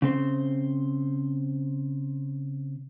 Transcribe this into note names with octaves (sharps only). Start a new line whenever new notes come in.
C#3 C4 C5